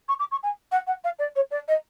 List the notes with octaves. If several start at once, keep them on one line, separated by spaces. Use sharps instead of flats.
C#6
D6
C#6
G#5
F#5
F#5
F5
D5
C#5
D5
D#5